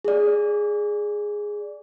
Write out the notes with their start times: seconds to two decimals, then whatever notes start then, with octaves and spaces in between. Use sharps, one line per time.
0.05 G#4 D5